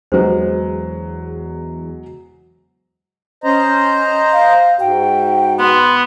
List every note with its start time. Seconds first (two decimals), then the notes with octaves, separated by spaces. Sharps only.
0.12 E2 F#3 G#3 A4 B4 C5
3.44 C#4 C5 D#5 A#5
4.33 F5
4.80 G#2 F#4 G5
5.59 B3 C6